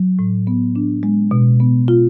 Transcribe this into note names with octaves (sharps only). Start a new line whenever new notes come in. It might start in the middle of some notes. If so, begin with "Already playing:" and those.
Already playing: F#3
A2
B3
D4
G#3
B2
B3
F4